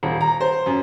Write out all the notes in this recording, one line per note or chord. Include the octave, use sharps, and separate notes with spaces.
D#1
A#5
C5
F#2